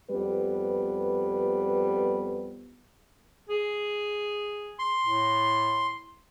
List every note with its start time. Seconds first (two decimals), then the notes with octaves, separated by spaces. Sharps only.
0.10 F2 G3 B3 B4
3.49 G#4
4.79 C6
5.06 A2